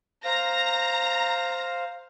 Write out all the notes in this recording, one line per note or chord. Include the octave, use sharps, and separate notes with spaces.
C5 F5 A#5 A#6